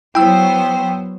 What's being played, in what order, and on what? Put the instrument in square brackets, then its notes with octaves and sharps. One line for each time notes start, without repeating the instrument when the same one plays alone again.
[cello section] F#3 B3 C5 [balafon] E4 [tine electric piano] G5 E6